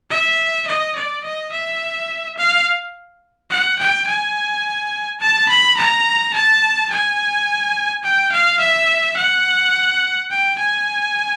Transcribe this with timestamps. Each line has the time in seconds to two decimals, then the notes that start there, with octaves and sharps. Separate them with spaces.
0.10 E5
0.67 D#5
0.96 D5
1.24 D#5
1.52 E5
2.37 F5
3.50 F#5
3.79 G5
4.07 G#5
5.20 A5
5.49 B5
5.77 A#5
6.34 A5
6.90 G#5
8.04 G5
8.32 F5
8.60 E5
9.17 F#5
10.31 G5
10.58 G#5